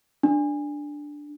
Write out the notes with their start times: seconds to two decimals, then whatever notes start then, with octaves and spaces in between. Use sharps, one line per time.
0.23 D4